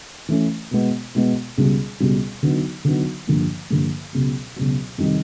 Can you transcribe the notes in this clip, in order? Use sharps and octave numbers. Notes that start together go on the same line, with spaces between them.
E3 A3 C#4
B2 G#3 B3
B2 G#3 B3
C#2 B2 G3
C#2 B2 G3
D3 F#3 B3 D#4
D3 F#3 B3 D#4
G2 D3 F3 A#3
G2 D3 F3 A#3
C#2 B2 F#3
C#2 B2 F#3
F2 C3 D#3 G3